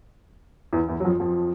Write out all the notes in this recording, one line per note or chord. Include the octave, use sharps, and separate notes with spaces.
E2 E3
E2 E3
F#3
F2 F3
F2 F3